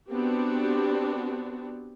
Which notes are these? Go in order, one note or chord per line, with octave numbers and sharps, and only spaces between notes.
B3 C4 D4 F#4 G4